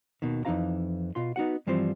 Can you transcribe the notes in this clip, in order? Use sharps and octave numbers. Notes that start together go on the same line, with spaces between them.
D#2 B2 D#3
F2 E3 D#4 F4 F5 A#5
B2 F4 C6
B3 D#4 F#4 F#5
G2 E3 F3 G3 C4 C5